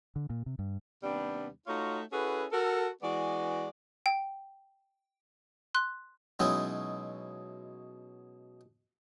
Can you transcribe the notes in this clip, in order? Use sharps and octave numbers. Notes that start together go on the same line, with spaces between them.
D3
A#2
C3
G2
D#2 C3 G3 B3 D4
A3 D#4 F4 F#4 C#5
C#4 E4 F#4 G#4 A4 B4
F#4 A4 A#4
E3 G#3 B3 F#4 D5
G5
C6 F#6
B2 F#3 G#3 C#4 D#4 E4